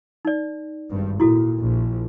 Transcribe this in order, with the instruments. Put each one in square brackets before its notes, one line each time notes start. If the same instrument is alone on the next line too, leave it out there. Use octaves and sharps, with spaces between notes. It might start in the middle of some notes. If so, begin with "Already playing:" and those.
[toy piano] D#4 D5
[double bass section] G#1 G2
[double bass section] A#2 [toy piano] E4 F#4 A4
[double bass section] A#1